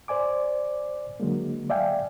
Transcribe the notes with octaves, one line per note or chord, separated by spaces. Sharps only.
C5 D5 G#5 D6
D3 F#3 G#3 A#3
D5 E5 F5 G5 G#5